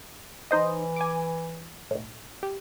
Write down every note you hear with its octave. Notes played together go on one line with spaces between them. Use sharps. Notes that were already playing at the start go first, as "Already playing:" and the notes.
E3 D#4 C5 D#5
G#5 D6
B1 A2
G4